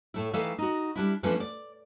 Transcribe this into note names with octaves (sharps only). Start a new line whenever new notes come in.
A2 A3 E4
D#3 E3 A3 A4 E5 F5
D#4 F#4
G3 D4 E4
E3 F3 A3 C#4 D4 B4
D5